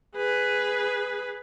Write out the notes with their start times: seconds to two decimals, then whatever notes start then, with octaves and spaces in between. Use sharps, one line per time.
0.15 G#4 B4